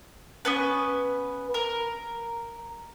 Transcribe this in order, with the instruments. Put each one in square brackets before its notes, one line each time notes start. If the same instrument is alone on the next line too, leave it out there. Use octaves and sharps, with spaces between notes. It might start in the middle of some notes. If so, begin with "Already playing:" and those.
[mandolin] B3 C#4 B4
A#4